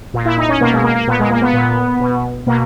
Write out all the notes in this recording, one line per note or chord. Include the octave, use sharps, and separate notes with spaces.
A#2
E4
D#4
C#4
B2 A#3
G#3
A#3
A#3
A#2 B3
G#3
A#3
B3
A#2
B2
B2 A#3